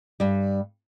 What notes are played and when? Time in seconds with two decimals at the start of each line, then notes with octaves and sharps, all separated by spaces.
0.20 G2 G3